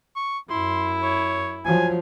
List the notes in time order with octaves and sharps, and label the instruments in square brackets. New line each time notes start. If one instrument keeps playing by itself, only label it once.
[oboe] C#6
[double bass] F#2 [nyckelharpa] E4 [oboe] C6
[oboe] C#5
[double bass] F3 F#3 [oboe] G#5